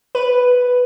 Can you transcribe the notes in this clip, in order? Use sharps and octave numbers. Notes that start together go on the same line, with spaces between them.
B4